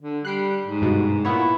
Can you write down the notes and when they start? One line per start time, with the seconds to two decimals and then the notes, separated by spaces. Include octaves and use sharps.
0.02 D3
0.25 G3 F#6 C7 D7
0.64 G#2
0.82 G2 B2
1.25 A#2 B3 E4 C#5